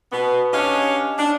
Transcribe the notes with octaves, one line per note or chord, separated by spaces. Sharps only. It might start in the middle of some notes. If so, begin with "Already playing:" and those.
B2 B3
C#4 D4 G4 C#5 D#5 F5
D4